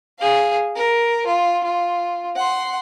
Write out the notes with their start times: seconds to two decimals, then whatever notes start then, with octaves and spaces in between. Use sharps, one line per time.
0.19 G#4 F5
0.75 A#4
1.26 F4
1.64 F4
2.36 F#5 C6